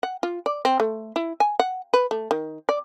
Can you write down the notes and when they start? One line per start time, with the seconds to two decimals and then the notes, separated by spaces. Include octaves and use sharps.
0.03 F#5
0.23 F4
0.46 D5
0.65 C4
0.80 A3
1.16 E4
1.40 G#5
1.60 F#5
1.94 B4
2.11 A3
2.31 D#3
2.69 D5